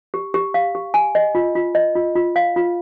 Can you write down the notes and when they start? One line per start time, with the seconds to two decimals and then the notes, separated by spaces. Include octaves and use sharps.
0.14 G4
0.34 G4
0.54 F5
0.75 G4
0.94 G#5
1.15 D#5
1.35 F4
1.55 F4
1.75 D#5
1.95 F4
2.15 F4
2.36 F5
2.56 F4